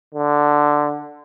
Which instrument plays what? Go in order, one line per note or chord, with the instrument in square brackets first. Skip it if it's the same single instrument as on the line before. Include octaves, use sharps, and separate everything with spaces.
[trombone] D3